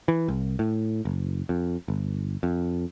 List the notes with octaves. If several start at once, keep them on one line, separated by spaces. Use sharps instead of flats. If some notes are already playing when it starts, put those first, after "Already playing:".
E3
C2
A2
F#1
F2
G1
F2